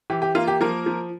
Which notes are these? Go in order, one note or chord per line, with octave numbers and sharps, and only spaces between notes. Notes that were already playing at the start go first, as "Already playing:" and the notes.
E3 G4
G4
A#3 F4
G4
F3 A#3 A#4
F3